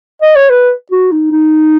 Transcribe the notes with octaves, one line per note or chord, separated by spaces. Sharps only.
D#5
C#5
B4
F#4
D#4
D#4